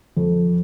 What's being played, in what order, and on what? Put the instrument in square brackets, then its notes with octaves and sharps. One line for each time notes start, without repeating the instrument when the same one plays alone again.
[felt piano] F2